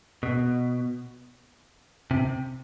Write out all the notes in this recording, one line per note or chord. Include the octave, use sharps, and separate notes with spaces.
B2
C3